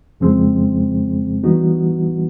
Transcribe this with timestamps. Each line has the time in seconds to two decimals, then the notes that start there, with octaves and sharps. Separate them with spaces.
0.20 F2 C#3 F3 G#3 C4
1.43 E3 G3 B3 D#4 F#4